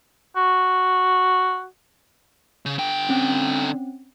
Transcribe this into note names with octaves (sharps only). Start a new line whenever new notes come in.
F#4
C#3
D3 G5
C4 C#4